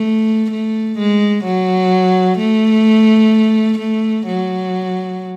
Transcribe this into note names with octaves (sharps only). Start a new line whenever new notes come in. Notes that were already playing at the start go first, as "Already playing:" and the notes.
Already playing: A3
A3
G#3
F#3
A3
A3
F#3